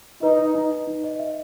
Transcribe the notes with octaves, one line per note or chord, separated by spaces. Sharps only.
D#4 B4
D#5
D#4
D#4
D#4
D#5
E5